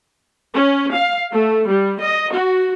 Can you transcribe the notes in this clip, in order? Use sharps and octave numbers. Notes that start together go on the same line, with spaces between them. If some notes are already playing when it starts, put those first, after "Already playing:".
C#4
F5
A3
G3
D#5
F#4